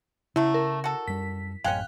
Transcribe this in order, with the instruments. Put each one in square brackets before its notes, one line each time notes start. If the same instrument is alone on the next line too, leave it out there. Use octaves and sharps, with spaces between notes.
[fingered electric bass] C#3 [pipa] F#3 A3 [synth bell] E4
[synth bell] A#4
[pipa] F#4 A4
[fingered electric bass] F#2 G3 [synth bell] B6
[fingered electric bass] A1 F#2 [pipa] G#3 C#4 [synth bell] F5 G5 F#6